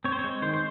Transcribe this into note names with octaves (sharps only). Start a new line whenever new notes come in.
C4 C#5
C5
G#3 C#5
D#3 C5
C5